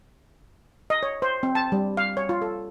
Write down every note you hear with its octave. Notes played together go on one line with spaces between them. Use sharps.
D#5
C#5
C5
C4
A5
G3
F5
C#5
F4
A4